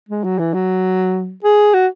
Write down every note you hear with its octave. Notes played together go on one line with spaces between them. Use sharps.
G#3
F#3
E3
F#3
G#4
F#4